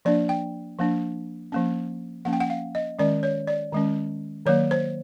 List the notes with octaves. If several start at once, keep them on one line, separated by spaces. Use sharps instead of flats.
F3 A#3 D4 D5
G5
F3 A#3 D4
F3 A#3 C#4
F3 A#3 C#4 F#5
G5
F#5
F5
D#5
D#3 G#3 C#4 D5
C#5
D5
D#3 G#3 C#4
D#3 F#3 A#3 C#5
C5